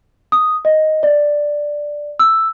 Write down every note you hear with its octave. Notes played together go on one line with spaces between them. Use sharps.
D#6
D#5
D5
E6